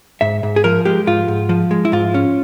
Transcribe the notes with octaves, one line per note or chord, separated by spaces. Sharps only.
G#2 E5
G#2
G#4
F3 A#4
G#3 G4
G#2 F4
G#2
F3
G#3
E4
G#2 F4
C#4